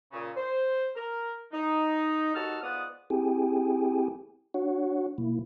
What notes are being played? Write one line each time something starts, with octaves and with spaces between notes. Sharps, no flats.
A#2 C#3
C5
A#4
D#4
D#2 D#4 F#4 A4 A5 F6
G#2 B3 F4 D5 F#5 D#6
C4 E4 G4 G#4 G5 G#5
D4 F#4 C#5 F#5
B2 A#3 E4